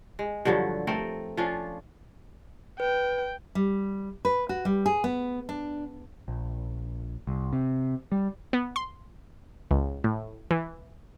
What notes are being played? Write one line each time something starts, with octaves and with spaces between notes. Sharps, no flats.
G#3
G2 D3 F3 F#3
A3 C4 A#4
F3 C#4 D4 F4
B4 G5
G3
B4
F#4
G3
G#4
B3
D4
A#1
C2
C3
G3
B3
C6
C#2
A2
E3